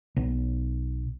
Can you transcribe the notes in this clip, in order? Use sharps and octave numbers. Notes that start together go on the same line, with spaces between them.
B1